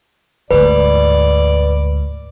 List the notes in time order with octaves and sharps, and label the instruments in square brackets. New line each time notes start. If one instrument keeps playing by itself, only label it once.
[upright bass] D2 G#2 [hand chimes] B4 [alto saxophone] D5